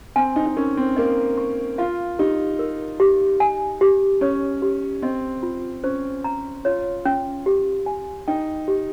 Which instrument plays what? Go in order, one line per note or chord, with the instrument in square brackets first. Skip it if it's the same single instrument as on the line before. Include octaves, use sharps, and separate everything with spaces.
[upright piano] C4 [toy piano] G#5
[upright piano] D#4
D#4
[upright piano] C#4 [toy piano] A#4
[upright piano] C4
[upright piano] A#3 [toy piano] D#5
[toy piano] C#6
[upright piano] F4 [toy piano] F5
[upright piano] D#4 [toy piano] G4
[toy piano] A#4
G4
G#5
G4
[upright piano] C#4 [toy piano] C#5
[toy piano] G4
[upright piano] C4 [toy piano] D#5
[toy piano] F4
[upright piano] C#4 [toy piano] C5
[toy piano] A#5
[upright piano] F4 [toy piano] C#5
[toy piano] C#4
G4
G#5
[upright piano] D#4 [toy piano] G5
[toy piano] G4